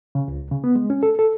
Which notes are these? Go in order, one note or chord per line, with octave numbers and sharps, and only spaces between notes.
C#3
C#2
C#3
B3
G#3
C#4
A4
A4